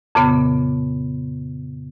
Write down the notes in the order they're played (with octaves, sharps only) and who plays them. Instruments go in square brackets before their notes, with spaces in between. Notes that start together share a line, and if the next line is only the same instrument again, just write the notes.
[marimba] F2 A#2 C#3 B3